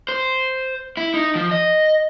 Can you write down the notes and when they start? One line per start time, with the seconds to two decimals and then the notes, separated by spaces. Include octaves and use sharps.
0.09 C5
0.97 E4
1.14 D#4
1.35 F3
1.51 D#5